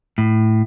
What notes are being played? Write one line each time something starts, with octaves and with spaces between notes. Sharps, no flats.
A2